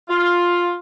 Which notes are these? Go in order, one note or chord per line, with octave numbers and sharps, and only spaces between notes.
F4